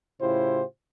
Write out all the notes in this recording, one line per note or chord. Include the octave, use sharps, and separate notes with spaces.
A2 C#3 E4 F4 G4 C5